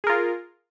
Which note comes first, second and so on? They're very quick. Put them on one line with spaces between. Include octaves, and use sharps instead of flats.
G#4 A#4 F4